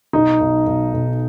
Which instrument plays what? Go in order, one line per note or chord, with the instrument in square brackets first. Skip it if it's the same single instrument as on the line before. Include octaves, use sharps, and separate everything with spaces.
[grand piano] B1 D#4
B1
B1
B1